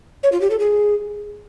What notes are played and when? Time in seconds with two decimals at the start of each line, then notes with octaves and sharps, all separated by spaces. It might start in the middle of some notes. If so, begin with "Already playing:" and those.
0.23 C#5
0.32 F4
0.41 G4
0.50 A4
0.59 G#4